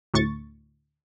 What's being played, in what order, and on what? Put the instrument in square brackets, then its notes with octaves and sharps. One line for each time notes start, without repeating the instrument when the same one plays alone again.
[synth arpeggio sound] D2 A2 C#6 A6